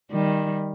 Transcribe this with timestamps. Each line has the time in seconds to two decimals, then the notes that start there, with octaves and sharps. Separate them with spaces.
0.11 D#3 G3